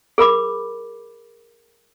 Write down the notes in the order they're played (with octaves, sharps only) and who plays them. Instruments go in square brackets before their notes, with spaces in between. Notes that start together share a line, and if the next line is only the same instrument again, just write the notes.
[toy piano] G#4 A#4 B5 D6